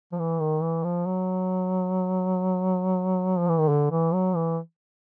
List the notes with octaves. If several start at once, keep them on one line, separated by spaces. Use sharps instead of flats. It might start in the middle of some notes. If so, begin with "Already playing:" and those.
F3
E3
D#3
E3
F3
F#3
F3
E3
D#3
D3
E3
F#3
E3